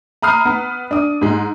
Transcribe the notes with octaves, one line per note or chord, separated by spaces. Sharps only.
A#5 B5 D#6 F6 C7
B3
D4 D#6
G#2 G#3